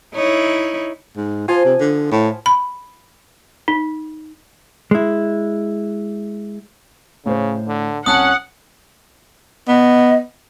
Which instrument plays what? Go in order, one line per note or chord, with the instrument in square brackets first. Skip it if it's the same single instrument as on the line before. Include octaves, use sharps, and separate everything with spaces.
[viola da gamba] D#4 E4 C#5
[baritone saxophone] G#2
[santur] F3 G#5 [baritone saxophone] F4
[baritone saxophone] C3
D3
A2
[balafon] B5
D#4
[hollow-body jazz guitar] G#3 E4
[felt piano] A2 C5 [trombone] C#3
[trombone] D3
[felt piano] C2 A5 [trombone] C#4 [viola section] F#5 [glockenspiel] D#6 F#6
[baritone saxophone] B3 [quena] D#5